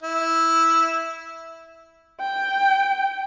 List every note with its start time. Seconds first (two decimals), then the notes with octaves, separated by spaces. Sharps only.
0.03 E4
2.20 G5